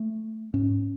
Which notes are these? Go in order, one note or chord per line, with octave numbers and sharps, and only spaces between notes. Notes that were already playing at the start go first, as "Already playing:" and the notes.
Already playing: A3
G#2 C#4